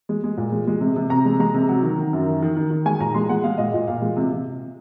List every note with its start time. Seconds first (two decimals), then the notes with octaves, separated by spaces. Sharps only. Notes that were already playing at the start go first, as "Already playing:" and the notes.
0.09 G#3
0.24 G#3
0.37 A#2
0.52 G#3
0.67 G#3
0.81 C3
0.96 C3
1.10 C3 A#5
1.25 G#3
1.39 G#3 A#5
1.54 C3
1.69 F#3
1.83 D#3
1.98 D#3
2.13 F#2
2.27 D#3
2.42 D#3
2.57 D#3
2.71 D#3
2.85 G#3 G#5
3.00 A#2 A#5
3.14 G#3 C6
3.29 G#3 F#5
3.44 G#3 F5
3.58 A#2 D#5
3.74 A#2
3.87 A#2 F5
4.02 G#3
4.17 C3
4.32 C3